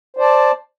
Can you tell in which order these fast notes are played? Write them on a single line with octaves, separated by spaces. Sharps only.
C5 D5 A5